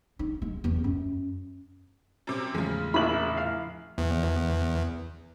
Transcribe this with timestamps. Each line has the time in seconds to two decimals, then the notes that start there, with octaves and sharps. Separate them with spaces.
0.19 D#4
0.42 G#3
0.64 E2
0.84 F#2
2.27 F#2 C3
2.55 E2 A2 C#3 F3 G#3
2.94 A#1 E4 B5 F#7
3.37 F5
3.98 E2